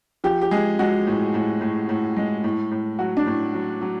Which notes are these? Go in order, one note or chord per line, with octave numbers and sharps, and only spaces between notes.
F3 G4
G4
G#3 G#4
G#3 F#4
A2
A2
A2
A2
G#3
A2
A2
F#3 F#4
D4
A2
F#3
F#3